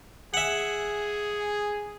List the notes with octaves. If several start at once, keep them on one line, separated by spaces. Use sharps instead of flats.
G#4 E5 F#5